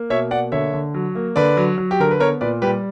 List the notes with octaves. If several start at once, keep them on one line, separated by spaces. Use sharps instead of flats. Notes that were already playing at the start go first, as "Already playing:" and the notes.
Already playing: A#3
B2 C#5 E5
A#3 D5 F#5
D3 C#5 E5
D3
F#3
A#3
D3 B4 D5
F#3
F#3
G4
D3 A#4
B4
B3 A#4 C#5
A#2 B4 D5
G3 G4 B4